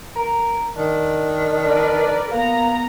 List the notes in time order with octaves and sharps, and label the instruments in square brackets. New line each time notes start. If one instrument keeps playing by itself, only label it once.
[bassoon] A#4
[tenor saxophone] D#3 [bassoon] D4
[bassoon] D4 [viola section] A#4 B4 D5
[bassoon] A#3 [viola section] B3 A#5